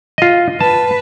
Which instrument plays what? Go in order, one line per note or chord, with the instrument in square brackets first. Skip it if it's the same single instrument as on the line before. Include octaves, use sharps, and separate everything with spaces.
[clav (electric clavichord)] F4 D#5
[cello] B4 [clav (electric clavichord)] A5